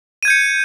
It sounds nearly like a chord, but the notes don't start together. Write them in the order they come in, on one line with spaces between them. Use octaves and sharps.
D#7 G#6 G6 C#7